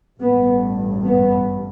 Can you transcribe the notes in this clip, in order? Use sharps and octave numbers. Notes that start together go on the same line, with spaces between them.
A1 G2 B3
B3